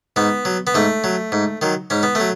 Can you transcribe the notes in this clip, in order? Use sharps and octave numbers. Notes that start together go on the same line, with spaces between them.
G#2 B3
F#3
B3
G#2 A3
F#3
G#2
D#3 F#3
G#2 C#4
B3
F#3 A3